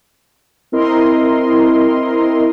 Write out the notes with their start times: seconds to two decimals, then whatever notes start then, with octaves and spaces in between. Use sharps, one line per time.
0.72 C4 E4 A#4 D#5 C6